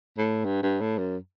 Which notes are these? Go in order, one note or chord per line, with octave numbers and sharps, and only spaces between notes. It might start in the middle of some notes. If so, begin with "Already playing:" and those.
A2
G2
G2
A2
F#2